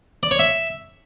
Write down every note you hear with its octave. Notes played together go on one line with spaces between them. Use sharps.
D5
C#5
E5